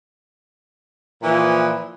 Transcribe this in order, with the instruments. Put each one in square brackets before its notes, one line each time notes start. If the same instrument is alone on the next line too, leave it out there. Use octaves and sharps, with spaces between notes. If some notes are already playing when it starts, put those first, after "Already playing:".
[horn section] A#2 E3 F3